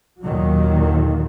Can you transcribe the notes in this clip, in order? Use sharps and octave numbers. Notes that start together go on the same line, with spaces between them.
D#2 A#2 D#3 F#3